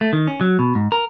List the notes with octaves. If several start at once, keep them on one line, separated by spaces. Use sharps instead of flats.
A3
D#3
C#4
F#3
B2
G#2
A#4